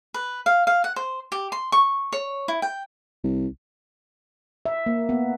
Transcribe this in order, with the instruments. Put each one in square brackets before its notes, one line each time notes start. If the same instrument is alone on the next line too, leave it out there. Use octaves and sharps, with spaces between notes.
[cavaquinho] B4
F5
F5
F#5
C5
G4
C6
C#6
C#5
E4
G5
[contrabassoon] C2
[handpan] E5
A#3
B3